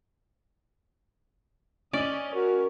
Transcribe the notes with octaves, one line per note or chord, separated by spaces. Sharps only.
C#4 D5 D#5 F#7
F#4 A#4